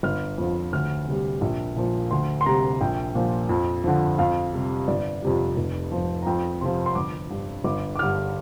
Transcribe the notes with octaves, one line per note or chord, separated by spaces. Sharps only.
G1 F6
F2 F3
D2 F6
C3 G3
A#1
A#2 F3
D2 C6
C6
C3 G3 A#5
A#1 G5
A#2 F3
F2
D3 F3
F2 F5
C3 G3
G1 D5
F2 C3 G3
F1
F2 F3
A#5
F2 G5
C3 F3 C6
C6
G1 D6
G2 G3
G1 D6
D6
G2 D3 F6